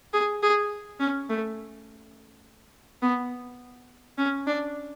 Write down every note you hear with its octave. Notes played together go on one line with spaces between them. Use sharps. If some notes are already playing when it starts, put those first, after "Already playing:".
G#4
G#4
C#4
A3
B3
C#4
D4